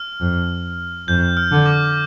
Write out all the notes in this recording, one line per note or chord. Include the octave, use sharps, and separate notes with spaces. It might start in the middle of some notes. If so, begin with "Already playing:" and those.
Already playing: F6
F2
F2 G6
F6
D3
D6